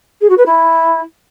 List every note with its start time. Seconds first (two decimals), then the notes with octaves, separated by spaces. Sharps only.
0.21 G#4
0.29 F#4
0.37 B4
0.46 E4